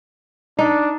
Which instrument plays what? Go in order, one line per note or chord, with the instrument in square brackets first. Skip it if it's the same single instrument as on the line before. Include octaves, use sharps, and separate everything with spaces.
[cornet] D4 [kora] D#4